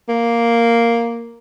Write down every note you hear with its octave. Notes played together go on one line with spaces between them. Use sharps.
A#3